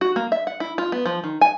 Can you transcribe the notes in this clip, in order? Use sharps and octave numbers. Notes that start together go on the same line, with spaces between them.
F#4
A#3
E5
F#5
E4
F4
B3
F3
D#3
G#5